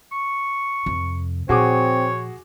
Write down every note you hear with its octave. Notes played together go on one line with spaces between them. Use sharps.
C#6
F2 C3
A#2 F3 C4 F#4 G#4 C#5 D6